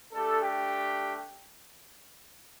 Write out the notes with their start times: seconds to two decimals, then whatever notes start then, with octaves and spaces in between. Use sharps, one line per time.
0.13 A3 D4 G4 A4
0.41 G4